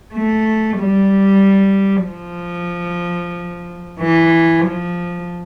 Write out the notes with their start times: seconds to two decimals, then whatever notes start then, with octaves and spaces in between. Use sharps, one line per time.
0.15 A3
0.80 G3
2.09 F3
4.02 E3
4.67 F3